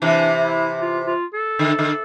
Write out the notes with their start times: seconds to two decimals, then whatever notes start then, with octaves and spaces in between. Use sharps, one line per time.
0.02 C3 E3 D4
0.42 E4
0.81 F4
1.07 F4
1.34 A4
1.59 D3
1.79 D3